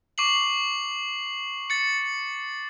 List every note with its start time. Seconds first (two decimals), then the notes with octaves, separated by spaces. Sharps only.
0.18 C#6 D6 C7 F#7
1.70 A6 C#7